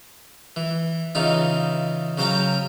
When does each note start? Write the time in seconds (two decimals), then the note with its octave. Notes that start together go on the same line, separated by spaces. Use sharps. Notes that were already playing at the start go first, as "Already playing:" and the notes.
0.56 E3
1.15 C#3 E3 D#4 F4
2.18 C#3 F#3 C5 F5 G5 A#5